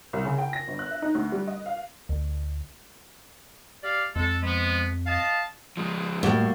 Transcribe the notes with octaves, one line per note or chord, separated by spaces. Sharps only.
C2
C#3
G5
A#6
G1
F#6
E5
D#4
D2
G3
D#5
F5
D2
G4 D5 F5
F2 G#3 A4
F3 G#3 B3
D#5 F5 A5
F3 G#3
A2 G3 A#3 F#4